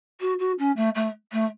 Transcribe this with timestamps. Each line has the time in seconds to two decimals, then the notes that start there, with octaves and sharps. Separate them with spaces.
0.20 F#4
0.39 F#4
0.58 C#4
0.76 A3
0.95 A3
1.32 A3